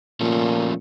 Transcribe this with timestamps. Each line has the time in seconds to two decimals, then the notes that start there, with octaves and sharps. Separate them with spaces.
0.21 A#2 F3 A3 C#4